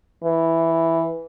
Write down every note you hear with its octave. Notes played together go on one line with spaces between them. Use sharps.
E3